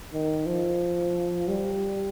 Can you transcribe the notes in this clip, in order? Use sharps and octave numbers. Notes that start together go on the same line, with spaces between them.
D#3
F3
G3